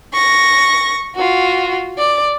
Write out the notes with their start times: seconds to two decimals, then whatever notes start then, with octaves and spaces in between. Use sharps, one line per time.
0.13 C#6 A#6
1.16 F4 F#4
1.99 D5